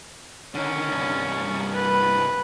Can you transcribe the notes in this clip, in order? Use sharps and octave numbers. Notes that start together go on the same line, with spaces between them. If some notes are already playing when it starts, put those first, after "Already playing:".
D3 D#3 C#4
C2 G2
B4